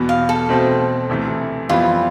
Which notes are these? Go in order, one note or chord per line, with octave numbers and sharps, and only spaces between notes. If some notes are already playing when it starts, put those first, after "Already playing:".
Already playing: E2 B2 B3
F5
A4
B2 A3 C4
D2 C3 E3 A3
F2 E3 G3 B3 F4